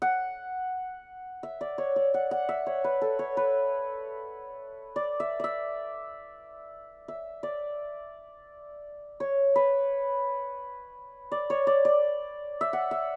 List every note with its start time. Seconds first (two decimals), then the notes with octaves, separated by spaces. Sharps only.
0.02 F#5
1.43 E5
1.61 D5
1.78 C#5
1.96 D5
2.14 F#5
2.31 F#5
2.49 E5
2.67 C#5
2.84 B4
3.02 A4
3.19 C#5
3.37 B4
4.96 D5
5.20 E5
5.40 D5 E5
7.08 E5
7.43 D5
9.20 C#5
9.56 B4
11.32 D5
11.50 C#5
11.67 D5
11.85 D5
12.61 E5
12.73 F#5
12.91 E5